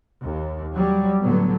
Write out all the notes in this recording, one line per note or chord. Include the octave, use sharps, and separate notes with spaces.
D#2
F#3 G3
A2 D3 F#3 B3